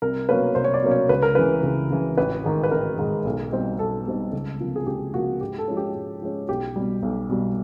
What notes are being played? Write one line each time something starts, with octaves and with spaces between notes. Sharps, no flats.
C2 A#4
B2 F#3 A#3 C#4 B4
C2 C5
C#5
D5
B2 F#3 A#3 C#4
C#5
C#2 B4
A#4
C#3 E3 B4
C#2
C#3 E3
A1 B4
G#2 D#3 G#3
B4
A1 A#4
G#2 D#3 G#3
B1
B2 G3 C4 D#4
B1 A4
B2 G3 C4 D#4
C#2
C3 F3 A#3
G#4
C#2 G4
C3 F3 A#3 F#4
G#2 G4
A4
F3 G#3 C#4
G4
G#2
F3 G#3 C#4
B1 G4
B2 G3
B1
B2 G3